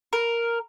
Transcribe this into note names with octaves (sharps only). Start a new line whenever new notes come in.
A#4